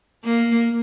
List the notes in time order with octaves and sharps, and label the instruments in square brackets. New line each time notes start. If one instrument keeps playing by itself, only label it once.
[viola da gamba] A#3